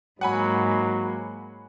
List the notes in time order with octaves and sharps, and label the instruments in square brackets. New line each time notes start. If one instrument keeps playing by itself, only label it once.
[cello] G#2 A#3 [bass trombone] F#3 [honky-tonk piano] F#5 G#5 B5